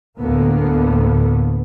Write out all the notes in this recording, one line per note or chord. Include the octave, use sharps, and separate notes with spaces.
D2 A2 D3 A#3 B3